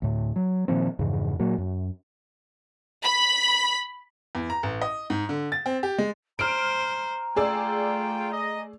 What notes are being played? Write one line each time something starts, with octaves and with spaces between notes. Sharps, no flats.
D2 A2
F#3
A#2 D#3 F3 C4
F2 G#2 C#3 E3
A#2 F#3 A#3
F#2
B5
E2
A#5
A1
D#5
G#2
D3
A6
C4
G4
G#3
C5 A#5 F6 D7
A3 F4 G#4 D5 G5 E6
D#5